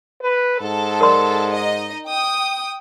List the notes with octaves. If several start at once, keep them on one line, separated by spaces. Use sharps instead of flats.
B4
G#2 A4
A#4 D5 C6
D#4 D#5
G5 D#6